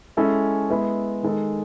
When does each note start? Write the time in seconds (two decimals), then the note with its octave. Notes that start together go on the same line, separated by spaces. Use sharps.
0.17 G#3 C#4 E4 A4
0.70 G#3 B3 E4
1.23 D#3 G#3 D#4 A4